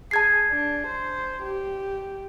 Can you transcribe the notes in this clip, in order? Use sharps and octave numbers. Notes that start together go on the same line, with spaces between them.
G#4 A5 G#6 C7
D4
C5
G4